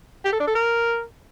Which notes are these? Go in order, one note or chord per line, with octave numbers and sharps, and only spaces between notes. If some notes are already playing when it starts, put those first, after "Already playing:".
G4
A4
D4
A4
A#4